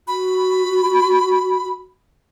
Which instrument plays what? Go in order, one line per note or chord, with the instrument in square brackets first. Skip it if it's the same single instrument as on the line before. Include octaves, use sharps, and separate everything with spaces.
[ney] F#4 [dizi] B5